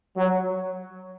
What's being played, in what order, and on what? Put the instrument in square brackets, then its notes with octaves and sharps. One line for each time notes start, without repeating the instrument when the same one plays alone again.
[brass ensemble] F#3